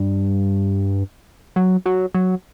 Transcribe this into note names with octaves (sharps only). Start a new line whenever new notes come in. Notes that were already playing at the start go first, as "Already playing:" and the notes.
Already playing: G2
F#3
F#3
F#3